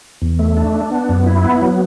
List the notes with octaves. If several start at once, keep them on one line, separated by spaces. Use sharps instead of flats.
E2
A3
D4
D4
B3
F#2
E4
B3
F#3